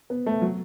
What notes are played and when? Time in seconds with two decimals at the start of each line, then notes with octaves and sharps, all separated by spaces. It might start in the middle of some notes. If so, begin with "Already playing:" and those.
0.10 B3
0.26 A3
0.42 F#3